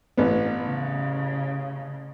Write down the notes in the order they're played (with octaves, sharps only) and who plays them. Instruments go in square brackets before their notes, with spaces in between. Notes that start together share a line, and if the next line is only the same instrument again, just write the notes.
[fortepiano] A1 B3
[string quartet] C#3